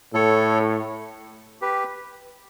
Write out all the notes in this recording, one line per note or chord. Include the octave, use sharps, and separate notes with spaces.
A2 A4 C#5
G4 B4